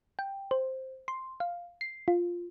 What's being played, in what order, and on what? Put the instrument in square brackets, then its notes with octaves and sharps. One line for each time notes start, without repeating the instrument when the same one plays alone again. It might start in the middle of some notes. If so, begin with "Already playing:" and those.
[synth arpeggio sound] G5
C5
C6
F5
C7
F4